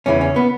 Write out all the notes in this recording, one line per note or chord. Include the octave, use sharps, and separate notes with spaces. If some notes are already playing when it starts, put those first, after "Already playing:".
E2 C#3 E3 C#4
C#4
B3